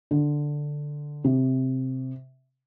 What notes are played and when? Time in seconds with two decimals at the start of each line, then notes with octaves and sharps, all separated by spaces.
0.11 D3
1.24 C3